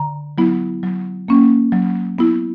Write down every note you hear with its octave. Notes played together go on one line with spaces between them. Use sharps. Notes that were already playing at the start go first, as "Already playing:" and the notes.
Already playing: D3 A#5
F#3 B3 E4
F#3
A#3 C#4
F#3
B3 E4